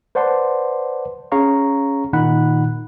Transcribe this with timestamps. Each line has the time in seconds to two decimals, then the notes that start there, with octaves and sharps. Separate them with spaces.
0.15 B4 C5 D5 F#5 A5 C6
1.32 C#4 G#4 C#5 F5 A#5 C#6
2.13 A#2 D#3 D#4 F#5 B5 F#6